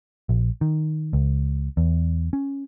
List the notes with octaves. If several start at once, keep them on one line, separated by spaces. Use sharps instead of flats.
A#1
D#3
C#2
E2
C#4